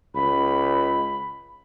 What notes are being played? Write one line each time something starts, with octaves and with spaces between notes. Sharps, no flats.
C#2 B5